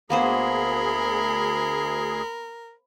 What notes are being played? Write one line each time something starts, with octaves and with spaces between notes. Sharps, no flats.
D2 A#3 B3 G#4 A#4 C5 B5